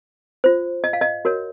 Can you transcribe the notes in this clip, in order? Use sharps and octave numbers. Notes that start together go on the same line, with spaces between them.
F4 C5
D#5
F5
D#5
F#4 A#4 C#5